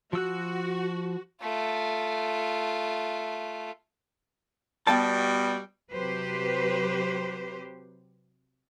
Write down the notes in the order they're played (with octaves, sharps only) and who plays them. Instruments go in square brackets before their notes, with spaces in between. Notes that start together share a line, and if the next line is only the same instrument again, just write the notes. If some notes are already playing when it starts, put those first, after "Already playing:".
[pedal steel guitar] F3 E6 F#6 [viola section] F#4
[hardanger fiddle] A3 F4
[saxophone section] B2 G3 [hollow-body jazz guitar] B3 G5 A5
[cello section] C3 F#3 G4 B4 C5